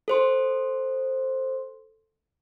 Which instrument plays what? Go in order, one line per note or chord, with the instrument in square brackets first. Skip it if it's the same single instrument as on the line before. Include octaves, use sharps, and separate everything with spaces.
[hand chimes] A4 C5 C6